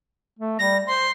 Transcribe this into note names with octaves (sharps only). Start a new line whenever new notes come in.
A3
G3 A#6
C5 C6